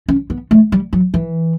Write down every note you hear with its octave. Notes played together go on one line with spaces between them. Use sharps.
C#4
B3
A3
G3
F#3
E3